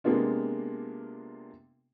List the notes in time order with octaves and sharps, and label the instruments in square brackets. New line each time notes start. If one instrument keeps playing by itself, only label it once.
[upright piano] C3 G#3 A#3 B3 D4 F4